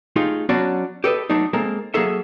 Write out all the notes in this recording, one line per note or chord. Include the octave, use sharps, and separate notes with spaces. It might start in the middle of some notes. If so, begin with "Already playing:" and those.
A3 D#4 F4 G4 G#4
F#3 B3 C#4 D4 F#4 D5
G4 A4 B4 D#5
F#3 A3 D4 D#4
G#3 A#3 C4 A4 A#4
F#3 A#3 G#4 A4 E5